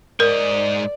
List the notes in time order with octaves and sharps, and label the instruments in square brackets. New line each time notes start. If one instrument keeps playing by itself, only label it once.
[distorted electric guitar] G#2 D#5 [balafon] A#4 [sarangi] D5